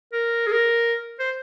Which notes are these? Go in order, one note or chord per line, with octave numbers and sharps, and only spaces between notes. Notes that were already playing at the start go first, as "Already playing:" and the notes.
A#4
G#4
A#4
C5